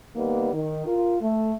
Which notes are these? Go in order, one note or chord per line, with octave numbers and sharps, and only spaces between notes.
D#3 G3 A#3 B3
D#3
F4 A#4
A3